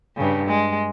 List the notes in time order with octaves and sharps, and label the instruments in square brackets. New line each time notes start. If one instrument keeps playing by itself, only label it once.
[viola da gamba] G2 C#3
G#3